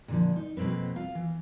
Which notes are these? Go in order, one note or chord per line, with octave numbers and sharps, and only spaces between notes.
A#2 D3 F3
D#4
F2 B2 A#3 C4 B4
F4 F5
E3